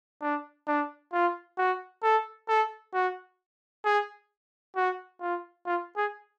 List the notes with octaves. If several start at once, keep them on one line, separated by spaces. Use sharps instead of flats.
D4
D4
F4
F#4
A4
A4
F#4
G#4
F#4
F4
F4
G#4